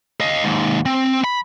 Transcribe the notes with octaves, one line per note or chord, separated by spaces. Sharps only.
D#5 F5
D#2 G#2
C4
B5